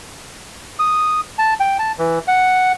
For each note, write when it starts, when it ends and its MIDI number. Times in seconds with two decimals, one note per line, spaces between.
0.79 1.21 87
1.38 1.54 81
1.60 1.77 79
1.79 1.92 81
1.99 2.19 52
2.28 2.72 78